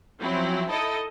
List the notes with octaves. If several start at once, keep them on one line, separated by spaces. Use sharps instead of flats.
F3 F#3 C4 C#4 E4
D#4 E4 A4 D#5 A5